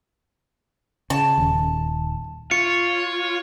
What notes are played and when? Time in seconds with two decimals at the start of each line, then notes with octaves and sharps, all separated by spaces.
1.10 C#3 A5
1.38 D#1 D#2
2.51 F4 C#5 C#7